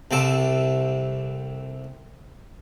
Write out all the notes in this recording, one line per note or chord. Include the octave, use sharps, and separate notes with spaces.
C2 C3 A4